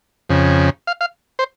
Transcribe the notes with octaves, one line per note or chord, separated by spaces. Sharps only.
F2 C#3
F5
F5
C5